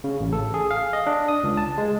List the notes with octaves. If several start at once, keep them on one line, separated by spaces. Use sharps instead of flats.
C#3
A1
A4
G#4
F5
D#5
D4
D#6
C#2
A5
G#3